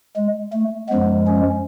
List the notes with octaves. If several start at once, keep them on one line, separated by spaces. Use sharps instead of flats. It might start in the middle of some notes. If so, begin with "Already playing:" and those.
G#3
A3
F#2 F3 G#3 B3
C#4